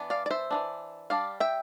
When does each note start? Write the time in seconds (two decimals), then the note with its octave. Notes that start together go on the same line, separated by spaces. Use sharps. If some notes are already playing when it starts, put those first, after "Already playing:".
Already playing: E3 B3 D4
0.10 D5 F5
0.26 D5
0.31 C5 E5
0.51 E3 B3 D4
1.10 G3 D4 D5 F5
1.40 E5 G5